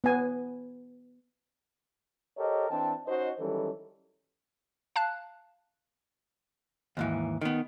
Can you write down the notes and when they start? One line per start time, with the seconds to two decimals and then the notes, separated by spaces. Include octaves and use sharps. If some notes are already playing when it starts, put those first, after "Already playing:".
0.04 B3 G#5
2.37 G4 A4 A#4 C5 C#5 D#5
2.70 E3 C4 D4 G5 A5
3.07 C#4 D#4 F#4 C5 D#5
3.39 D#3 E3 F#3 G3 C#4 A4
4.96 F5 A5 F#6
6.97 D#2 G#2 E3
7.41 D#3 B3